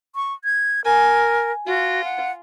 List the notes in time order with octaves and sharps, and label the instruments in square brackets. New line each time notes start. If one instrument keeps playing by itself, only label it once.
[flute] C#6
G#6
[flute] A#4 [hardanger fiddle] G#5
[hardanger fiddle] F4 [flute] F#4
[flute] F#5